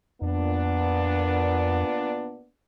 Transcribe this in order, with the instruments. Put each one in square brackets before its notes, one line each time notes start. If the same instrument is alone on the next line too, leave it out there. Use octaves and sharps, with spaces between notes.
[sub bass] F2 [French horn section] A#2 B3 D4